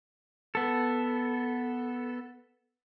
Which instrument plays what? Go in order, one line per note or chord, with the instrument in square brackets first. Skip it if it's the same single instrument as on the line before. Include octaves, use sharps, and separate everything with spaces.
[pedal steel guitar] B3 A4